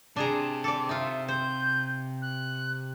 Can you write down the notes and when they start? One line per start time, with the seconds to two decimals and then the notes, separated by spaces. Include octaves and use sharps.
0.16 C3 D4 G#4 A5 A#5
0.64 A4 D5 D6
0.89 D#4 F4 E5
1.28 C5 G6
2.22 F#6